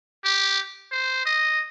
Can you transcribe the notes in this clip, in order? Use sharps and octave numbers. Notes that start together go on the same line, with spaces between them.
G4
C5
D#5